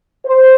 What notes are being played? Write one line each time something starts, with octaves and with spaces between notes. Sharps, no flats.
C5